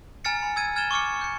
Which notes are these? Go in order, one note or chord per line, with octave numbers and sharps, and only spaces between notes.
G#5 A#5 F6 A6 C#7
B5
E6 F6 G#6 A6 D#7
F6 G#6 A6 D#7 E7 G7
C#6 D6 F6 C#7
G6 C#7